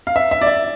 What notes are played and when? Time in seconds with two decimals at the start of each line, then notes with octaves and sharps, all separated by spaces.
0.07 F5
0.16 E5
0.31 E5
0.41 D5
0.47 E5